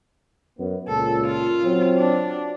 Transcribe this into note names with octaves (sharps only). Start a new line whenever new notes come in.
F#2 B3
C#2 A#2 A4
F4
F#3 C4
D4